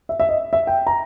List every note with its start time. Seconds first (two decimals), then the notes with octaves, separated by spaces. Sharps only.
0.09 E5
0.20 E5
0.29 D#5
0.53 E5
0.67 G5
0.87 A#5